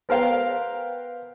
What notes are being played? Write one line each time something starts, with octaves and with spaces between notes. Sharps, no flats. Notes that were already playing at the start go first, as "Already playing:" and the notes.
B3 A#4 C5 F5 G5